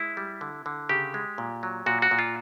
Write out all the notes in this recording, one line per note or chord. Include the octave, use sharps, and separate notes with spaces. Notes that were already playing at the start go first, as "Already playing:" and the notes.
Already playing: G#3 E4
G3
D3
D3
C#3 G4
G#3
A#2
F#3
A#2 F#4
F#4
A#2
F4